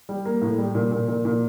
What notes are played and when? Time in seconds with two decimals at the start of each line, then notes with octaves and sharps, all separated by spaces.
0.09 G3
0.25 A#3
0.42 A2
0.58 G3
0.75 A#2
0.92 A#2
1.08 A#2
1.25 A#2